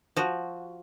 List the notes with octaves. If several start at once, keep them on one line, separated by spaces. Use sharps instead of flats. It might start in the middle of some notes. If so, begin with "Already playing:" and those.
F3 F#4